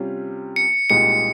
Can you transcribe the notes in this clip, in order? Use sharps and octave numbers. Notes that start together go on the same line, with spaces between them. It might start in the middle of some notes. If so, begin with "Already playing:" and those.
Already playing: C3 G3 C#4 F4
C#7
C2 A#2 G#3 D#4 G4 C#7